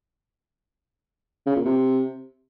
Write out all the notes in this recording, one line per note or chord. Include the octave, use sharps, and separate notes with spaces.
C#3
A#2
C3